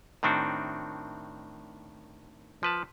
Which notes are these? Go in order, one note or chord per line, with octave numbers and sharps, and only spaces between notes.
A2 D#3 C4 D4 F#4
F3 B4 A5